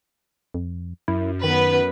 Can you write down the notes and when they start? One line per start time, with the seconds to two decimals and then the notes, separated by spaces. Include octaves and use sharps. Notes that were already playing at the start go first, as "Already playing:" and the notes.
0.54 F2
1.08 F#2 E4
1.43 D#3 B3 B4